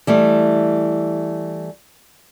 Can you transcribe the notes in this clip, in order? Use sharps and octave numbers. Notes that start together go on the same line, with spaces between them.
E3 G3 A3